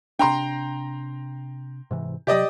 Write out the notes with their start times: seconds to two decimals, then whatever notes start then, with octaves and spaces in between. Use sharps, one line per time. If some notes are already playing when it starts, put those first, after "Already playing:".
0.19 C3 D4 G5 A#5 C6
1.91 G#2 C3 E3
2.27 C3 F#3 G4 D5 D#5